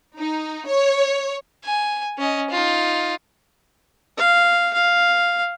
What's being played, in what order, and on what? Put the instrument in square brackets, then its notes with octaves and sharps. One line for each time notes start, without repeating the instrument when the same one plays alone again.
[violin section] D#4
C#5
[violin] G#5
C#4 D#5
D#4 F4
[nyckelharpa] F5
F5